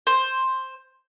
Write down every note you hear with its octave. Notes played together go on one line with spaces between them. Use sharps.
C5